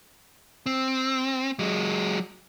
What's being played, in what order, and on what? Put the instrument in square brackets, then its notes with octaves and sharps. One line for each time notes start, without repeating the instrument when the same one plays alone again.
[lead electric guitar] C4
F#3 G#3